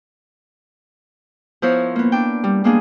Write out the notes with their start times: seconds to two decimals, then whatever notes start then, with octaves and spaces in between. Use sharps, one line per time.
1.62 F3 B3 E4 A#4 C5 C#5
1.96 A#3 B3
2.12 D4 G5
2.44 G3
2.64 G3 G#3 A#3 B3 D4 G#4